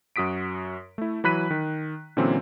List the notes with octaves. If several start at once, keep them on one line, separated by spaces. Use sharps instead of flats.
F#2 F#4 D#6 B6 D7
A3 E4
E3 F#3 B5 F#6 B6 D#7
D#3
A#2 D3 E3 F#3 C4 C#4